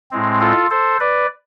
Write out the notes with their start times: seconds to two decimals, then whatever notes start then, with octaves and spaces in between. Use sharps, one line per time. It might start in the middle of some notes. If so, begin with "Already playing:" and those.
0.11 A2 G#3 C4
0.40 F4 A4
0.70 A4 C5
1.00 B4 D5